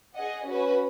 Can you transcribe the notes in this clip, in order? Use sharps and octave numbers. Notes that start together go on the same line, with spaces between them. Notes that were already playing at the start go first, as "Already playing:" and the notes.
G#4 D#5 F#5
C#4 F#4 B4